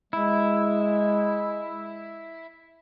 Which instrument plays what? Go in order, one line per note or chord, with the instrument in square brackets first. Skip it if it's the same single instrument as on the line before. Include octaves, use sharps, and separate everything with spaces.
[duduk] G#3 [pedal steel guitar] E4